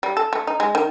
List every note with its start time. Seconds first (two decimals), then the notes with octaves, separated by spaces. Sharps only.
0.03 G3
0.17 A4
0.33 A3
0.47 D#4
0.60 G#3
0.75 D#3